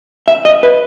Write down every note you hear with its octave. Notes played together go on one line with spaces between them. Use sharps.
E5
D#5
B4